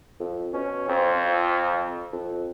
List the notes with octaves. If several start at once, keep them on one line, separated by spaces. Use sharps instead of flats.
F2
B2 C#4
F2 C4
F3
F2